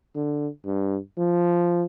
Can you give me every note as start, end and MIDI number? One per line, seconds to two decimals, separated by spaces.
0.15 0.47 50
0.65 0.97 43
1.18 1.84 53